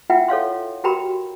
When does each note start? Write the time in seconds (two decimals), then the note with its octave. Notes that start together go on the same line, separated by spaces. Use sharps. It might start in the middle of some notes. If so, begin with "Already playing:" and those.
0.10 E4 F4 E5 F#5 G5
0.28 A4 C#5 F5 C6
0.84 F#4 G4 A#4 G5 A#5 B5